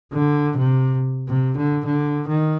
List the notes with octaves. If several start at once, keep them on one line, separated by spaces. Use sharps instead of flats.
D3
C3
C3
D3
D3
D#3